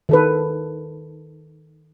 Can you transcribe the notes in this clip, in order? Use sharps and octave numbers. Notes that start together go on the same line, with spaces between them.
D#3 A4 B4